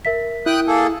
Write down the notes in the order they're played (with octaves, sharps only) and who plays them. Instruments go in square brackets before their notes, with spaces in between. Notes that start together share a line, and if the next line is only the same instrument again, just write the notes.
[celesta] A#4 E5 B6
[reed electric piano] E4 [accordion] G5 D#6 F#6
[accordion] A#3 G#4 A4